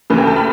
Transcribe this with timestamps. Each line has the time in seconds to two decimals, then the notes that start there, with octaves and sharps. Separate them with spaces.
0.10 D2 C#3 E3
0.18 G5
0.27 A5
0.36 B5